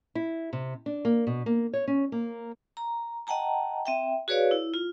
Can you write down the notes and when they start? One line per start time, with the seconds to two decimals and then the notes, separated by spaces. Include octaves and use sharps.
0.15 E4
0.53 C3
0.86 D4
1.05 A#3
1.27 B2
1.46 A#3
1.73 C#5
1.87 C#4
2.12 A#3
2.77 A#5
3.27 D#5 F#5 G5 A5 A#5
3.86 C4 E5 G5
4.28 F#4 G#4 B4 C#5 D5 F5
4.51 E4
4.74 F4